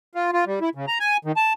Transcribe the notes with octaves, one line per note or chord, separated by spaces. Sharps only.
F4
F4
G3
E4
C#3
A#5
G#5
D#3
A5